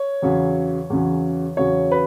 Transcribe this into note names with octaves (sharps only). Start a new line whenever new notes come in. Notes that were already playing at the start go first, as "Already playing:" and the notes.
Already playing: C#5
E2 C#3 F#3
E2 C#3 F#3
E2 C#3 F#3 C#5
B4